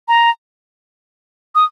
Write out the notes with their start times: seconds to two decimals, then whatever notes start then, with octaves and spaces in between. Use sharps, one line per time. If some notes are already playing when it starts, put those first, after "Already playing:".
0.08 A#5
1.55 D#6